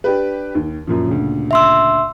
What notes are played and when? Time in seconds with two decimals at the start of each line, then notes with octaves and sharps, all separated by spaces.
0.04 D4 G4 B4
0.55 D#2
0.87 F#2 A#2 F3
1.06 D2 A#2 C#3
1.51 E5 C6 E6